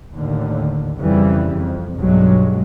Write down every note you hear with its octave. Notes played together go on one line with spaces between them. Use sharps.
D#2 A2 D3
F2 C#3 E3 G3
F2
B1 G2 F#3 G#3